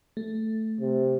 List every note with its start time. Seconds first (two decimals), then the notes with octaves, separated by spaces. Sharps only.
0.17 A3
0.81 C3